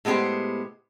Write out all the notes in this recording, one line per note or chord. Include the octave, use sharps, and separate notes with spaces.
A2 G#3 B3 G4 C5